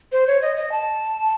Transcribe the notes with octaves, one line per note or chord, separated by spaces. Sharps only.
C5
C#5
D#5
D#5
A5